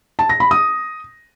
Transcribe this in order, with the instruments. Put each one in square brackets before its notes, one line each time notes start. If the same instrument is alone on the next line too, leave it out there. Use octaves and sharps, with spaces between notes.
[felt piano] A5
A#6
B5
D#6